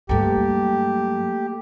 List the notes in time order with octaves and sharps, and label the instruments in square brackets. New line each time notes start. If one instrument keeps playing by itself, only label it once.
[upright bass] G2 F#3 [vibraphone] A3 A#3 A4 [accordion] G4